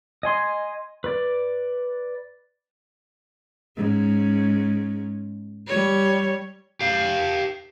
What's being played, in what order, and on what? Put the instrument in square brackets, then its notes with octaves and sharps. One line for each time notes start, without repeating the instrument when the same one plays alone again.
[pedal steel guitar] D#5 G#5 C6
B4 D5
[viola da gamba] G#2 C#4
G3 C#5
[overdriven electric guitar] G4 F5